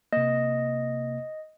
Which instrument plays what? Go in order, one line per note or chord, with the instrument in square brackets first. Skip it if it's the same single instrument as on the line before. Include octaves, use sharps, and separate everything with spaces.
[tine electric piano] C3 A#3 [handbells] D#5